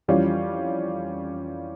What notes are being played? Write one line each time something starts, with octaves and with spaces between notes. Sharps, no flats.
F2 E3 G3 C#4 F4